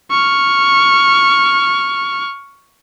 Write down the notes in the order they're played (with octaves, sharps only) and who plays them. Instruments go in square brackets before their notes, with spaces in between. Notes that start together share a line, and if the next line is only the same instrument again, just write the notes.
[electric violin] C#6 F6